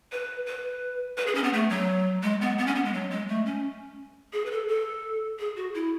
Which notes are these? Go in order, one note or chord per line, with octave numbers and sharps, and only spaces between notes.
B4
B4
B4
G#4
C#4
B3
A3
F#3
G#3
B3
B3
C#4
B3
G#3
F#3
G#3
A3
C#4
G#4
B4
A4
A4
G#4
F#4
E4